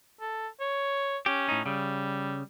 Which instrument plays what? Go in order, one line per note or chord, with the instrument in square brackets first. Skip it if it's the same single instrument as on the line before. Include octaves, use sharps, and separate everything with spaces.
[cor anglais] A4
C#5
[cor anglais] C#4 [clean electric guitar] G4
[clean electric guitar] A2 D#4
[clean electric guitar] C#3 [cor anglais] G3